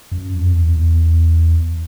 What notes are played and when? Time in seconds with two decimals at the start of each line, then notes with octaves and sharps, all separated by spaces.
0.12 F#2
0.34 F2
0.56 E2
0.77 E2